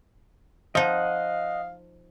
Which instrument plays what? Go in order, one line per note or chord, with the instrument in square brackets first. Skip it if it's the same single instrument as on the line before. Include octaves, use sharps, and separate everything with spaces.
[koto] F3 D#4 [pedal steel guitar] D#5 F#5 [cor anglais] F5